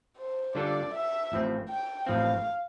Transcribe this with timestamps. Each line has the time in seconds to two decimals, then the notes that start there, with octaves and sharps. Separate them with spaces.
0.17 C5
0.55 D3 G3 D4 F4 A4 D5
0.93 E5
1.32 A1 A2 F3 C4
1.69 G5
2.06 A1 A2 F3 C4 F5